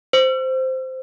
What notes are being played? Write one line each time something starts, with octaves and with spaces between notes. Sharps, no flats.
C5